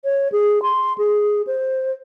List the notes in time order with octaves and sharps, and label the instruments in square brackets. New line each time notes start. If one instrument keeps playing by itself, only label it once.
[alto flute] C#5
G#4
C6
G#4
C5